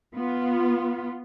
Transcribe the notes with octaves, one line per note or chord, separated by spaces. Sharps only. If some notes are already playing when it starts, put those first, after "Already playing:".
B3 F4